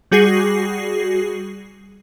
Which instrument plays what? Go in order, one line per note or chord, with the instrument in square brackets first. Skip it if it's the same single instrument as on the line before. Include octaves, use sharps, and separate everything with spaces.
[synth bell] G3 F#4 G#4 A#6 C7